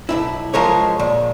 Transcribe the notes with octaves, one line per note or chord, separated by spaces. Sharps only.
B1 F#2 E4
F3 G#3 A#4 C#5
A#2